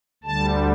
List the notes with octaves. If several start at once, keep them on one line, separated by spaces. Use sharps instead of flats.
D2 D3 G3 A5